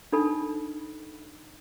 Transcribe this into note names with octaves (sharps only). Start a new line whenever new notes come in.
D4 D#4 A4 B5